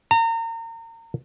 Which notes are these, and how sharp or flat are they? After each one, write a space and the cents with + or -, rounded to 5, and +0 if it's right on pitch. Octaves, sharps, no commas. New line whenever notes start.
A#5 -35